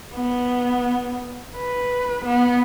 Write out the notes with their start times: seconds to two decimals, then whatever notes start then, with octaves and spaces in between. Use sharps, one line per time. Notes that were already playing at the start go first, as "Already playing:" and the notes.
0.14 B3
1.56 B4
2.25 B3